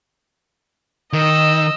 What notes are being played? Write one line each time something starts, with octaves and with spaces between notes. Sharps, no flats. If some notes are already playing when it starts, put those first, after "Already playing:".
D#3 D#5 E6